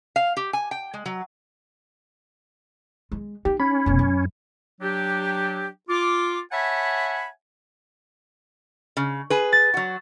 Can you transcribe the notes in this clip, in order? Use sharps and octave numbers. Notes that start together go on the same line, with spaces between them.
F5
G4
G#5
G5
G#3
F#3
G#3
D#4 G4
C#4 B5
F1 B2
F#2
F#3 D4 G4
F4 D6
C#5 E5 F#5 G#5 A5 B5
C#3
G#4 B4
A6
F#3 F#4